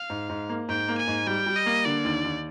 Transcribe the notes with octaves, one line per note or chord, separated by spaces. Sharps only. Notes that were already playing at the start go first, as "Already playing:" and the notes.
Already playing: F5
G#2
G#2
A#3
G#2 G5
A#3
G#5
G#2
G3 G5
G3
D#5
A#3
D3 D5
D#2
D#2